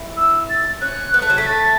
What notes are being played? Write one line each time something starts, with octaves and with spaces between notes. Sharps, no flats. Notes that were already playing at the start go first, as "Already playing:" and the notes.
Already playing: E4
E6
A6
C#4 F#6
B3
A3
F#3
A3 B6
A6